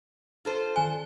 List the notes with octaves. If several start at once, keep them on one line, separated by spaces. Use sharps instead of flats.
F4 A4 C5
D#3 G#5